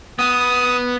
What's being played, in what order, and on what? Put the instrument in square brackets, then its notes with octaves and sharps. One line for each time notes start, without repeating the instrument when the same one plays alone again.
[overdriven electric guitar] B3 [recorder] D#6